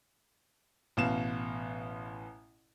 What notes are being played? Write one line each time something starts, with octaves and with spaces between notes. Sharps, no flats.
A1 B2 F5 E7